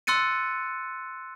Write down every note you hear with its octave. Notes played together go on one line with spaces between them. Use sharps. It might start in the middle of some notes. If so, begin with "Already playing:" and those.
C6 E6 F#6 A6 C#7 D#7